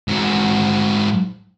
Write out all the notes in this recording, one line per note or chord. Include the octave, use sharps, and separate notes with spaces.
G#2 F#4